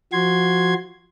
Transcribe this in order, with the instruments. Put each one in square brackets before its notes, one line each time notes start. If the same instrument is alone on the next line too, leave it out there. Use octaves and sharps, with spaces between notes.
[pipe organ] F3 F#4 C6 G#6